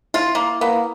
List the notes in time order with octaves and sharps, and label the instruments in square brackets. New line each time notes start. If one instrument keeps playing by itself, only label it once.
[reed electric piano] E4 [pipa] F4
[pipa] A#3
[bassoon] A#3 [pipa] B3